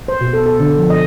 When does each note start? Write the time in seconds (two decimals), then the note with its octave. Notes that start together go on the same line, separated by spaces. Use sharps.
0.08 C5
0.21 B2
0.33 A4
0.46 A4
0.60 D3
0.78 F3
0.90 D#5